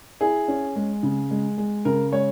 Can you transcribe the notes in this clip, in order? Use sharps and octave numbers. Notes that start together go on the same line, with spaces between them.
E4 G#4
C#4
G#3
C#3
G#3
G#3
C#3 A#4
G#3 C#5